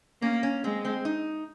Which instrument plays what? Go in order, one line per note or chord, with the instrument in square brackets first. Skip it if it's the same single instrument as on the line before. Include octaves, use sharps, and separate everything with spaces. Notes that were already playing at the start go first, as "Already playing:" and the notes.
[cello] A#3 [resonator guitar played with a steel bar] C#4
[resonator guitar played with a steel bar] C#4
[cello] G#3 [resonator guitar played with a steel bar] C4
[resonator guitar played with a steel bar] C4
D#4